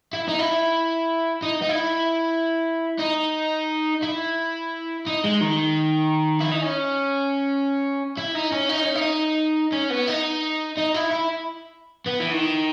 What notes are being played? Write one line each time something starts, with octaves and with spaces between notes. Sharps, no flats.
E4
D#4
E4
D#4
D#4
E4
D#4
E4
D#4
G#3
D#3
E4
D#4
C#4
E4
D#4
C#4
D#4
C#4
D#4
C#4
B3
D#4
D#4
E4
E4
B3
E3
D#3